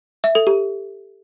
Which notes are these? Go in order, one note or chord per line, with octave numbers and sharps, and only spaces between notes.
E5
A4
G4